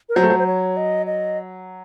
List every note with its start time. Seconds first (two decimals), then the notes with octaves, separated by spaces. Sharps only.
0.09 A#4
0.16 F#3 C5
0.23 A3
0.30 F#3
0.39 C5
0.46 C#5
0.77 D#5
1.06 D#5